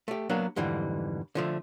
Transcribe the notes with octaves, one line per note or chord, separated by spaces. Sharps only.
A3 G4
F#3 A#3 B3 D4
F2 G#2 D3 E3 G3
D3 F3 A3